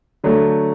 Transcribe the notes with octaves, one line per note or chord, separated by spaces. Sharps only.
D3 F#3 A3